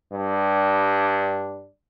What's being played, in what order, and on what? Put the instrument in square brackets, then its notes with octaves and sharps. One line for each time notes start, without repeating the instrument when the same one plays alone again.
[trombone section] G2 G3 D4